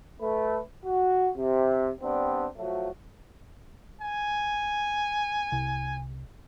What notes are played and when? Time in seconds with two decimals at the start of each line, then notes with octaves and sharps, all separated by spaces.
0.21 A3 B4
0.85 F#4
1.37 C3
2.01 G3 B3 C4 D4
2.57 F3 F#3 A3 F#4
4.01 G#5
5.52 C2